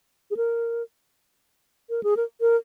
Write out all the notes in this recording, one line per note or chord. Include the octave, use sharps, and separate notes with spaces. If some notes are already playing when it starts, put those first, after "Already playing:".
G#4
A#4
A#4
G#4
A#4
A#4